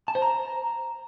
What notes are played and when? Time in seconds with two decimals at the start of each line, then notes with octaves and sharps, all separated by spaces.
0.08 A5
0.15 C5
0.22 A#5